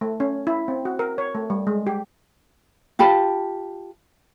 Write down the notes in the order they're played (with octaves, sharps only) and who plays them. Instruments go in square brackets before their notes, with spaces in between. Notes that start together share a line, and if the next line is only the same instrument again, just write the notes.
[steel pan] A3
C#4
E4
C4
F#4
A#4
C#5
A3
G3
G#3
G4
[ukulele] F4 G4 A5 B5